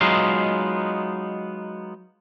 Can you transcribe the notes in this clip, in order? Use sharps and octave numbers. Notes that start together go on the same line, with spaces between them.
F#3 G#3 B3 D#4 F4